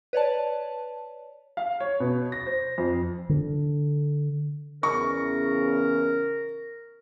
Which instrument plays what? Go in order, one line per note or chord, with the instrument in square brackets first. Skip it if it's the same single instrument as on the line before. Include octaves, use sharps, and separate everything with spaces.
[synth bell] B4 C#5 D5 A5
[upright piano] F5
C#5
B2
A#6
C5
F2
[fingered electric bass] D3
[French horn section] E2 C#3 [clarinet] A#4 [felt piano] C#6